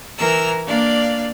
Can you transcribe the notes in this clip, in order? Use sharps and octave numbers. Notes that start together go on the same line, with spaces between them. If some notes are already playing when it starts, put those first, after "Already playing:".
E3 A#4 A#5 E6
A#3 D4 D5 F5